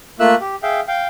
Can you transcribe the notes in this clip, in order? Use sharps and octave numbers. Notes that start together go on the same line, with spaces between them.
A3 A#3 F4 E5 E6 F#6
G4
G#4 E5 F5 G5
F5 G5